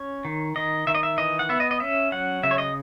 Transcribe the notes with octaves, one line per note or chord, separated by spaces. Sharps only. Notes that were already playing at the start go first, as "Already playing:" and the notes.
Already playing: C#4 C#5
D#3
D#3 D#5
D#3 E5
D#5
E5
E3 D#5
F#5
B3 E5
D#5
D#5
C#4 E5
F#3 F#5
C#3 E5
C#5
D#5